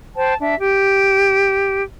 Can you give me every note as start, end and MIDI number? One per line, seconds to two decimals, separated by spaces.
0.16 0.34 72
0.16 0.34 79
0.16 0.34 81
0.40 0.54 62
0.40 0.54 76
0.58 1.84 67